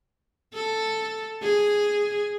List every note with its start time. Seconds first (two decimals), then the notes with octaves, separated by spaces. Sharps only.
0.54 A4
1.43 G#4